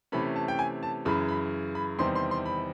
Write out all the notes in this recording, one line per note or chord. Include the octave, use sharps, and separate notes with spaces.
C3 E3 A3 C#4 B5
A5
G5
G#5
A5
F#2 C#3 E3 B5
B5
B5
E2 C3 D#3 G3 C4 C6
C6
C6
B5